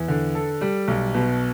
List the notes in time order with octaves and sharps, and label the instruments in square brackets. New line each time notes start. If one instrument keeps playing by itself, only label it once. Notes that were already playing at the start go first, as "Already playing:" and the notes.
Already playing: [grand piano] E2
D3
A4
G3
B1
B2